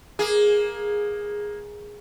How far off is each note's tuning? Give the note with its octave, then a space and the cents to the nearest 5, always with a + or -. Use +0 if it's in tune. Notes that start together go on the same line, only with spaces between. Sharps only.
A#3 +15 G#4 -5